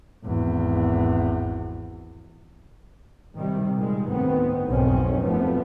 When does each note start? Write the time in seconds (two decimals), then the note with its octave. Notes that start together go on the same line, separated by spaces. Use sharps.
0.25 G#1 E2
3.36 C3 D#3 G3
3.78 A#2 G3 G#3
4.08 D2 A2 D#3 B3 C4
4.67 B1 F2 G#2 D#3 C4 C#4
5.22 F1 F#2 C3 F3 A3 B3